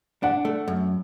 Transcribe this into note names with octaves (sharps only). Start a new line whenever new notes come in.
D4 F#5
A3
F#2